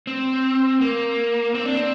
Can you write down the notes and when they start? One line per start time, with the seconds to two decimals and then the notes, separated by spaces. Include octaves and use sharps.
0.07 C4
0.81 A#3
1.54 C4
1.65 D4
1.75 C4